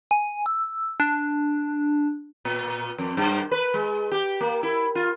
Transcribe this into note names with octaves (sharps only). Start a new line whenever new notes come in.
G#5
E6
D4
A#2
F2
G2
B4
G#3
G4
A#3
E4
F4